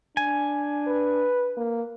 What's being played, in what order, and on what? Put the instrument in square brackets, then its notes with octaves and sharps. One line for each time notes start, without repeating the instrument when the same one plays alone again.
[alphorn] D4 [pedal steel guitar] G#5
[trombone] B4
[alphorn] A#3